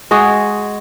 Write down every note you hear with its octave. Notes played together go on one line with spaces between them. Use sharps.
G#3 F#4 G#4